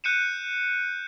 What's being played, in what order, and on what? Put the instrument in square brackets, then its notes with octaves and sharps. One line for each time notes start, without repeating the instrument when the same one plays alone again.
[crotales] F#6 G6 C#7 D#7 E7